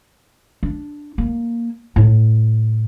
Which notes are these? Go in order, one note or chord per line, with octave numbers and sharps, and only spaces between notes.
D4
A#3
A2